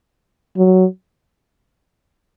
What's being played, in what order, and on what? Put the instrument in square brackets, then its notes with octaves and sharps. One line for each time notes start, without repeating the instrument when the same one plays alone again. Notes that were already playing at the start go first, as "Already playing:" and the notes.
[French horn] F#3